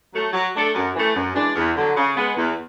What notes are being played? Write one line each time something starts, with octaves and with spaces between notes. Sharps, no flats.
F#3 A3
F#3
A3 D4 A4
F#2
E3 A3
F#2
E3 G#3 D4
E2
D3 F#3
C#3
G#3 B3
E2